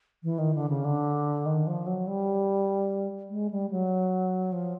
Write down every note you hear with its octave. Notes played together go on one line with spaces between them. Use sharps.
E3
D#3
D3
C#3
D3
D#3
F3
F#3
G3
G#3
G3
F#3
F3